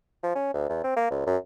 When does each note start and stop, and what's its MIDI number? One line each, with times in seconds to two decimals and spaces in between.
0.23 0.35 53
0.35 0.51 61
0.54 0.68 38
0.69 0.81 40
0.84 0.95 60
0.96 1.07 58
1.11 1.22 37
1.27 1.37 42